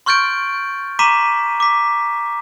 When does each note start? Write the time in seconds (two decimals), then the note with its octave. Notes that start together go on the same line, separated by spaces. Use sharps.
0.06 C6 C#6 F6 G6 A6 D7
0.99 A#5 C6 D6 B6 D#7 E7
1.60 D6 B6